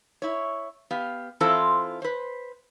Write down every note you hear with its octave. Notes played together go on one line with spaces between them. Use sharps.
E4 C#5
B3 G4 F5
E3 C4 E4 F4 A4 C5
B4 C5